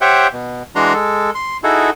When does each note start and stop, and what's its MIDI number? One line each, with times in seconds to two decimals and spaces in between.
0.01 0.27 67
0.01 0.27 72
0.01 0.27 73
0.01 0.27 76
0.01 0.27 78
0.01 0.27 79
0.33 0.63 47
0.75 0.93 52
0.75 0.93 56
0.75 0.93 62
0.75 0.93 66
0.75 0.93 82
0.75 0.93 84
0.93 1.31 56
0.93 1.31 69
1.35 1.57 84
1.64 1.90 63
1.64 1.90 64
1.64 1.90 66
1.64 1.90 68
1.64 1.90 69